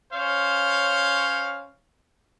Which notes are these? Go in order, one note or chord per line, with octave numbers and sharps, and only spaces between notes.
C#4 C5 C#5 F5